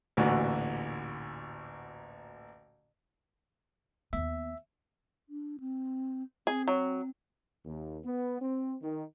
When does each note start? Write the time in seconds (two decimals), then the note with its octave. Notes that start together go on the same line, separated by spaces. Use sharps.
0.17 A1 D2 A#2 D3 E3 F#4
4.13 D#2 B3 E5
5.29 D4
5.60 C4
6.47 C4 G#4
6.68 F#3
7.65 D#2
8.05 B3
8.40 C4
8.82 D#3